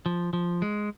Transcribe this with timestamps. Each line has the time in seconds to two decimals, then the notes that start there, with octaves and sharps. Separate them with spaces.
0.06 F3
0.33 F3
0.62 G#3